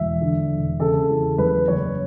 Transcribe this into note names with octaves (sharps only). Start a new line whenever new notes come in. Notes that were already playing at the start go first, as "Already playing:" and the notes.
Already playing: E1 E5
D3
E1
C#3 A4
E2
F#1 B4
F#1 C#5